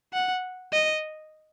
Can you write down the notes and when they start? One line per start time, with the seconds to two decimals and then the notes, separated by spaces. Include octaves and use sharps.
0.13 F#5
0.72 D#5